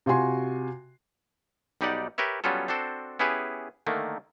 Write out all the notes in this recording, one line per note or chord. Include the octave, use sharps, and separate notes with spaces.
C3 F4 F#4 G#5 C6
B1 G3 D#4 G4 D5 F#5
G4 A#4 B4 C#5 E5
F#3 G3 B3 C#4 F4 A4
C4 D4 F#4 A4 C5
B3 C#4 E4 G4 G#4 B4
D3 D#3 A3 A#3